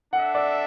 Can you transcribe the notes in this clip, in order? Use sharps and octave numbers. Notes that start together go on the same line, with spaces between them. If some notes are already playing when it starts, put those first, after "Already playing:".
D4 A4 E5 F#5
D5